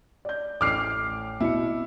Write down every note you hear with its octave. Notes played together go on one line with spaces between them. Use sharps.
D5 G6
A1 A3 D6 F6 C7
B2 E4 C#7